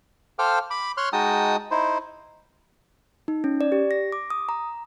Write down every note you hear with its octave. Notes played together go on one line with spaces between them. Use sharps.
A4 C5 F5 G5 D6 F6
B5 D6
C#5 C6 F6 F#6
G#3 D#4 F#4 G5 A5 D#6
D#4 E4 C5
D#4
C#4
D5
G4
A#6
D6
D#6
A#5